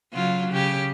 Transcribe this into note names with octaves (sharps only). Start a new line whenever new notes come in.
C#3 F#3 F4
C#3 G4